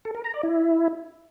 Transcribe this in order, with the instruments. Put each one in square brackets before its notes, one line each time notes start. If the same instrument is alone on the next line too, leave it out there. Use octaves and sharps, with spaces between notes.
[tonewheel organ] A4
A#4
A#5
D5
E4